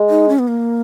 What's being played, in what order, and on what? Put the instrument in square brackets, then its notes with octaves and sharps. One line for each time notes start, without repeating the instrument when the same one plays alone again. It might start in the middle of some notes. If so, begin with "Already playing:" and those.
Already playing: [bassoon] G#3
[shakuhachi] D#4
C#4
B3
A#3